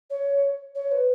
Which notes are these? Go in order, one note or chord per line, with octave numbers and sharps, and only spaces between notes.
C#5
C#5
B4